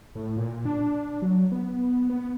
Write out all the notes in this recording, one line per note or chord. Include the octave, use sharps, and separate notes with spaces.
A2
A#2
D4
F#3
B3
B3